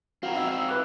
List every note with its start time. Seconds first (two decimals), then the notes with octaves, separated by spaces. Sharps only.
0.23 C4 F#4 A#4 F5
0.36 D#4 E5 F5 E6
0.69 B4 E5 D6 F#6